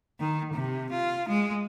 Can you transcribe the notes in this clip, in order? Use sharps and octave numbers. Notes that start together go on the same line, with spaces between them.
D#3
C3
F4
G#3